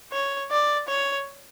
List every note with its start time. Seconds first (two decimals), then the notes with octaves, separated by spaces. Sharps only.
0.12 C#5
0.51 D5
0.88 C#5